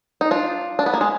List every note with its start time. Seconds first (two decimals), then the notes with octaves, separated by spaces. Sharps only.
0.21 D#4
0.31 D4 F4
0.79 D4
0.86 B3
0.94 A#3
1.01 G#3